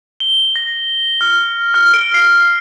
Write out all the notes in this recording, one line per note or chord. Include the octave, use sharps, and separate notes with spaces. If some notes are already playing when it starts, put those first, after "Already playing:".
G7
A#6
F6
F6
D7
C7